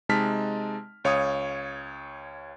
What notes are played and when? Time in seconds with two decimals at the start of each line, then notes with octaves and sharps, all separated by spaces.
0.09 C3 G#3 D#4 A5 F6 B6
1.04 C#2 C#5 F5 C#6 D#6